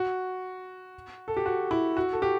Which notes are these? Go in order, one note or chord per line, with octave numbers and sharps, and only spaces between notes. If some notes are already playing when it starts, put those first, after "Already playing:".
Already playing: F#4
A4
G4
F#4
E4
F#4
A4
G4